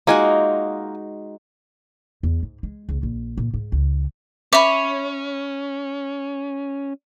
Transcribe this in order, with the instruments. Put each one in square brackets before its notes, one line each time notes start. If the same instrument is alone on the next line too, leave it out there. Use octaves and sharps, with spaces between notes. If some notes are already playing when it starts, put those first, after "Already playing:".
[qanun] G#3 D#4 F#4 [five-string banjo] A#3 F4 G#5
[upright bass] E2
G#2
G#3
C#2
A#1
A#2
G#2
C#2
[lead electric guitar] C#4 [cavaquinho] C#5 B5 [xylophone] E5 D6